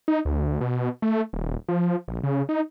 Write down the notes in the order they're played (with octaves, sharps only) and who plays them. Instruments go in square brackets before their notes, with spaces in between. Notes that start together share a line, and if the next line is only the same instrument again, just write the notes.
[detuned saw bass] D#4
D2
B2
A3
D#1
F3
A#1
C#3
D#4